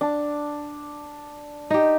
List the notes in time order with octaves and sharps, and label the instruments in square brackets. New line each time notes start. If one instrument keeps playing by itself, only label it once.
[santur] D4
[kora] D#4 G4